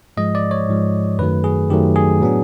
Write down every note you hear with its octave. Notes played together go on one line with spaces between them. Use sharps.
G#2 F3 G#3 D#5
D5
C#5
G#2 F3 G#3
F#2 D#3 F#3 A3 B4
G#4
F#2 D#3 F#3 A3 G4
G#4
A2 F#3 B3 D4